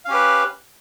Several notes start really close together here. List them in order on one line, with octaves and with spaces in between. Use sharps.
F5 C#4 G4 B4